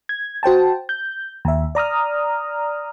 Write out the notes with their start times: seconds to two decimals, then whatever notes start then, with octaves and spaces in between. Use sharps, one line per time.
0.09 G#6
0.43 F#4 C5 G5 A5
0.89 G6
1.45 D#2 E5
1.75 D5 A#5 D#6 F6